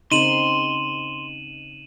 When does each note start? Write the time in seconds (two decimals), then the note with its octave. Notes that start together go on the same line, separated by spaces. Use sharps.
0.12 C#3 C4 D#4 C6 D#7 E7 F#7